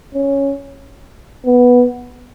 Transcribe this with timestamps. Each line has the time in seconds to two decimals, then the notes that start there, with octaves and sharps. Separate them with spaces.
0.15 C#4
1.45 B3